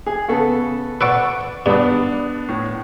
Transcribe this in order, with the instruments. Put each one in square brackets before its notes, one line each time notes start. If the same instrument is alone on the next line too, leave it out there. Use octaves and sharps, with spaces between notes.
[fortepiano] G#4
C#3 B3 A4
[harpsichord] B4 D5 C#6 [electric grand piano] F#5 E6
[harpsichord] G2 [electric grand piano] B3 D4 [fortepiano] D5 B5 D#6
[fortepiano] A2